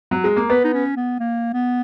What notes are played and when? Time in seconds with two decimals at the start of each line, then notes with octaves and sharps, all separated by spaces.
0.11 F#3
0.24 G#3
0.36 A#3
0.50 B3 B4
0.64 D#4
0.73 C#4
0.96 B3
1.20 A#3
1.54 B3